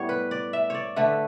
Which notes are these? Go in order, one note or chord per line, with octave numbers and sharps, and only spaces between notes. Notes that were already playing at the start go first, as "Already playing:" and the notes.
Already playing: A2 G3 B3 C#5
B4
D5
E5
C#5 D5
D3 A3 B4